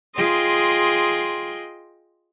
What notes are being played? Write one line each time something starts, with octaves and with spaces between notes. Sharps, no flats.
F4 G#4 D#5 G5 C6